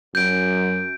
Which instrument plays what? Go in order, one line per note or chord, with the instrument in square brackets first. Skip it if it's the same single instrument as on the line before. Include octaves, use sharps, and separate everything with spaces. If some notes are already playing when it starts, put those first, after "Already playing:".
[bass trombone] F#2 [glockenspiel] G6 D7